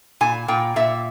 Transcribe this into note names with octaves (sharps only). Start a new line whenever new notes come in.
A#2 G#5
A#2 G5
A#2 E5